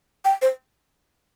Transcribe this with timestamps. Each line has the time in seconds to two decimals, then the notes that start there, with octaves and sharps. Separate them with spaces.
0.25 G5
0.42 C5